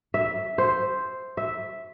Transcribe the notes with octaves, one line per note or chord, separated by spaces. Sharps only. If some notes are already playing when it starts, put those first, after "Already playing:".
E5
C5
E5